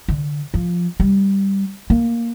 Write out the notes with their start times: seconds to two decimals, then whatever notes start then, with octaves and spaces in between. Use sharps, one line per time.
0.08 D3
0.54 F3
1.00 G3
1.90 A#3